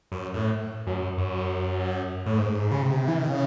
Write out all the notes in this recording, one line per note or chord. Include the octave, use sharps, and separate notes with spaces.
F#2
A2
F#2
F#2
A2
G#2
C#3
C3
E3
D#3
C#3